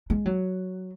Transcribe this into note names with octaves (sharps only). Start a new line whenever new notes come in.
G#3
F#3